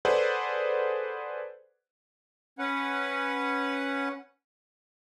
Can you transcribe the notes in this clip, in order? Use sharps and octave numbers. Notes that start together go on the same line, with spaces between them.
G#4 A4 B4 C5 D5 F#5
C#4 B4 F#5